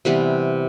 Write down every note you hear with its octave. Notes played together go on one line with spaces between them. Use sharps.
C3 E3 G3 B3 B4